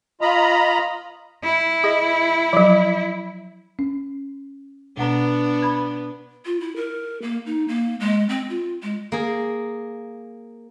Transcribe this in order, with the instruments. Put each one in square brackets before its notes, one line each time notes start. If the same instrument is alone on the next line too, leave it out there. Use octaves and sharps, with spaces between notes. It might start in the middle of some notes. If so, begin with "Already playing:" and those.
[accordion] F4 D#5 A#5 B5
[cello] E4
[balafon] G#4 D#5
F3 F#3
[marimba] C#4
[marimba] B2 F#5 A#5 [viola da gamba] B3 D4
[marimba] B5 G#6
[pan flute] F4
E4
A#4
A#3
D#4
A#3
G#3
C4
F4
G#3
[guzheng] A#3 G#4